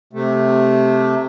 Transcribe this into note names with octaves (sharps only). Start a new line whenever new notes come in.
C3 A3